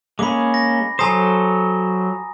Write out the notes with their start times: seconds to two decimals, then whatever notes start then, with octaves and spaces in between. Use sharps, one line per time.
0.19 G#3 A#3 C#4 B5 D6
0.54 A#6
0.99 F#3 A4 C5 G#5 A#5 D#6